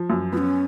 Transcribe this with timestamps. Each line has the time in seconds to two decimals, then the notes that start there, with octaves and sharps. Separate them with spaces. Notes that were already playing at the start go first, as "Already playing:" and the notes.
Already playing: F3
0.10 F#2
0.33 B3 F4
0.38 C#4